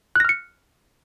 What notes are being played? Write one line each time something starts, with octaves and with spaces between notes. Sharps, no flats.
F6 F#6 A#6 C#7